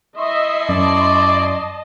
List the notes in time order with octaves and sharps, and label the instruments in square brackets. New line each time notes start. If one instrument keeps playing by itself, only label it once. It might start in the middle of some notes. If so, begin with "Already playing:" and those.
[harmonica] E4 C6 C#6 [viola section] D#5 E5
[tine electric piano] F#2 [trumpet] D5 [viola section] D#5 A5